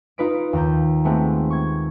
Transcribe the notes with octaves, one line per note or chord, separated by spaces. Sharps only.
D#4 F4 B4 B6 D7
D#2 A#5 G6
G#3 A3 B3 C4 G4
C#6 G#6